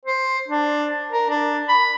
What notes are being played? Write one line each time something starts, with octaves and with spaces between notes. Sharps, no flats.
C5
D4
A#4
D4
B5